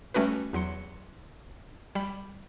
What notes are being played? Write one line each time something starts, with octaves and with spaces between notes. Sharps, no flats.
G3 A3 C#4 F#4 B4
E2 F#3 C6 C#7
G3 B5